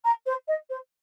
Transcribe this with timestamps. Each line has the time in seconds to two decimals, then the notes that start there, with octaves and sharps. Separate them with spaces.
0.04 A#5
0.26 C5
0.48 D#5
0.69 C5